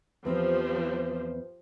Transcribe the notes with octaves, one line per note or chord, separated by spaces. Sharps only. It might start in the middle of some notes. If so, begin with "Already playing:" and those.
E2 F3 C4 G4 C5